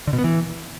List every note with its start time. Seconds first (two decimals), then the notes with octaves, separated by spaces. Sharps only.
0.07 D3
0.13 B2
0.18 B3
0.24 E3